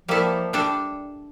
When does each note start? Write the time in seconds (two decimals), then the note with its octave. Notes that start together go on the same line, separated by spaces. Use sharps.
0.08 F3 G3 A#3 E4 A4
0.53 G3 D4 A4